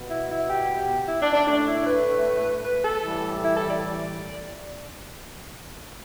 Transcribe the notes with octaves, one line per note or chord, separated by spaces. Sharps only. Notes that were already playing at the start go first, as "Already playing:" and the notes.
Already playing: B2 B3
E4
E4
G4
E4
D4
D4
A2 A3 D4
E4
B4
B4
A4
A2 E3 G3
E4
A4
D5